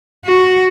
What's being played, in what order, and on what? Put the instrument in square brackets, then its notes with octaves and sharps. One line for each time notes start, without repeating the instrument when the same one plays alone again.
[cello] F#4